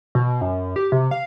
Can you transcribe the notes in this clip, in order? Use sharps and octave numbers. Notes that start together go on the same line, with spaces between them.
B2
F#2
G4
C3
F5